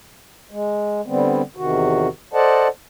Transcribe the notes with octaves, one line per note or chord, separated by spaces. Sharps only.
G#3
D3 G3 B3 C4
E2 C3 D#3 F#4
A4 C5 D5 D#5 F#5 A5